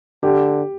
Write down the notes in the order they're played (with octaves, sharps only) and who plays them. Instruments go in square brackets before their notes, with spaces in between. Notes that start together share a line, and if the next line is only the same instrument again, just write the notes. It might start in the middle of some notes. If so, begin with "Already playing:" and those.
[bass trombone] D3 [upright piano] G4